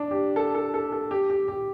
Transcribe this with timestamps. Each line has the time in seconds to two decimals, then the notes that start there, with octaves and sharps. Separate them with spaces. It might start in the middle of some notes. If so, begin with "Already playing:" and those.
Already playing: D4
0.11 G4
0.36 A4
0.54 A4
0.74 A4
0.92 A4
1.11 G4
1.30 G4
1.48 G4